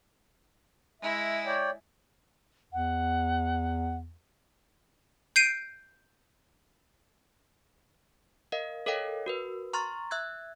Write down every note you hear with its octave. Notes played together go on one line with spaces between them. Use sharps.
G#3 E4 E5
C#5 D5 G5
E2 F#5
G6 C7 D7 D#7
A#4 D#5 F5
A4 A#4 C#5 D#5 F5 G5
F#4 A#4 B4
A#5 C6 C#6 F6 A6
E5 E6 F#6 G#6